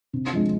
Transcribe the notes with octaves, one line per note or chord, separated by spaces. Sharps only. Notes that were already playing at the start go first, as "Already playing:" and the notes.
C3
F3 G#3